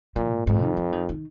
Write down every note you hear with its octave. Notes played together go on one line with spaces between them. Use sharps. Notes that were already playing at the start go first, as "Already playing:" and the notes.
A#2 F3
G#2
F2 G#2
D#3
F3
D#3
D#3